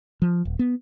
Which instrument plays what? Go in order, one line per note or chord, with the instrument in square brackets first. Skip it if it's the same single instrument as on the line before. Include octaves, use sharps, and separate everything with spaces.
[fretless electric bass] F3
D#1
B3